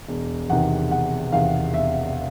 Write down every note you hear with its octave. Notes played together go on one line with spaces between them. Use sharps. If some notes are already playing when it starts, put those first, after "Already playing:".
E1
E2 C3 D#3 F#5
E1 F#5
E2 C3 D#3 F5
E1 E5